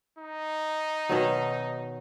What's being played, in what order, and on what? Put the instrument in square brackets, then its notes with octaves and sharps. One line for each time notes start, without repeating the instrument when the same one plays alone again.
[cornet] D#4
[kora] B2 D#3 F#3